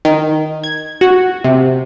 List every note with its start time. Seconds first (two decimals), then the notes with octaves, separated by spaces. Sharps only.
0.05 D#3
0.64 G#6
1.01 F#4
1.44 C3